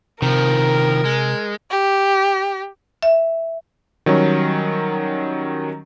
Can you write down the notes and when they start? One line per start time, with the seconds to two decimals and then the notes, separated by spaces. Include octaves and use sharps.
0.22 C3 D#3 F3 A#4
1.05 G#3
1.70 G4
3.03 E5
4.06 D#3 F#3 G3 C#4